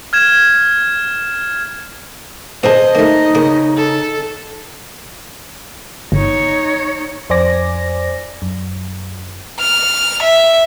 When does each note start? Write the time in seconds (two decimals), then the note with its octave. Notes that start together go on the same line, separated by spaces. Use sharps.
0.13 F6 G#6 E7
2.63 A#2 D4 G#4 C5 D#5 A5
2.95 A3 A#3 D#4
3.35 C#3 A#3 D6
3.77 A4
6.12 G1 D#4 C#5
7.30 F2 C5 D5 G#5 D6 A#6
8.42 F#2
9.60 F6
10.23 E5